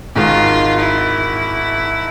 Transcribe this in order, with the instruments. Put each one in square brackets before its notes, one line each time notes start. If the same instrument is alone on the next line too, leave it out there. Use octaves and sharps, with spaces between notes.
[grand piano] G#1 G#2 D#3 [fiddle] F4
[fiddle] E4